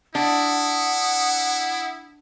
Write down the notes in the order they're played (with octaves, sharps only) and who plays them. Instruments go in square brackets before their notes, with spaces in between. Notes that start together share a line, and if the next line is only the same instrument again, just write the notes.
[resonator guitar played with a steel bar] D4 [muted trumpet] E4 [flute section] F#5 D#6